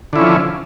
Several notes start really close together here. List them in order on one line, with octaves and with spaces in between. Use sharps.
D3 E4 C#4 F3